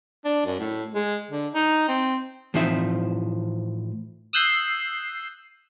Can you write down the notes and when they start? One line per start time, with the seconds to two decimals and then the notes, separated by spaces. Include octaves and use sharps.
0.25 D4
0.45 F#2
0.59 A2
0.94 G#3
1.31 D3
1.54 D#4
1.88 C4
2.54 A2 E3 F3 C4 D#4 E5
4.33 D#6 E6 F#6 G6 C7